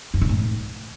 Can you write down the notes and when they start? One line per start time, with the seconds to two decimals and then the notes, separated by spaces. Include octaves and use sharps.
0.14 F#2
0.21 A#2
0.29 A2